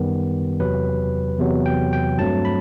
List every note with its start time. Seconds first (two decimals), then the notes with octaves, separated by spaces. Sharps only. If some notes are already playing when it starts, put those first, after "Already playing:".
Already playing: F#2 D#3 G3 B3 G4
0.60 E2 C3 F#3 B4
1.39 E2 C3 F#3 B3
1.66 G5
1.93 G5
2.18 G2 F#3 A3 C4 A5
2.45 B5